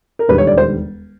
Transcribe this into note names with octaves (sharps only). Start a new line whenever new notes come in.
A#4
E1 D#2 D3 G3 B4
C#5
D5
C5